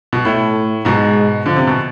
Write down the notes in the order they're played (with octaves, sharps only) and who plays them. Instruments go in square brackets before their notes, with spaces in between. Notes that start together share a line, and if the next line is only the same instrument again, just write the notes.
[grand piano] B2
[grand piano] A2 [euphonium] A3
[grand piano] G#2 B2 [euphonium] G#3
[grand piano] D3 [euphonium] F3
[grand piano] C3
B2